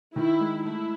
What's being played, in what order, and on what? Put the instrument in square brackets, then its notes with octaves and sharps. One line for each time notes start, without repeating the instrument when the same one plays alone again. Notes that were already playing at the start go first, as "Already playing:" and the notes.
[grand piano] D#3 [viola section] E4
[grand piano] G#3
[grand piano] A3 [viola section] E4